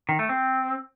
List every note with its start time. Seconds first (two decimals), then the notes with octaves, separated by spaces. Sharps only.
0.09 D#3
0.19 A3
0.29 C4